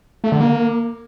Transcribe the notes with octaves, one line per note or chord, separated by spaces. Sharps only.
A3
D3
A#3